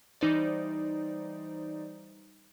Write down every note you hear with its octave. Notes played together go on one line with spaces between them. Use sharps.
E3 G3 D#4 C5 D5